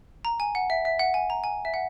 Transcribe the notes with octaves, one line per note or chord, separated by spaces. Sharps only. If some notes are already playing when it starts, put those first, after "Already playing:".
A#5
G#5
F#5
E5
E5
F#5
G#5
A#5
G#5
E5
F#5